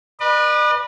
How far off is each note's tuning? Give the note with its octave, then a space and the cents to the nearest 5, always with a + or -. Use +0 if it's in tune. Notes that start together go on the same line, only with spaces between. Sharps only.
B4 -20 D5 +45